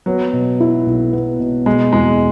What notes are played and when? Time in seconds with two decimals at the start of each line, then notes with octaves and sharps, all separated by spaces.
0.06 F#3 B3
0.33 B2
0.60 E4
0.86 B1
1.13 B3
1.40 B2
1.66 B2 G#3
1.93 E2 G#3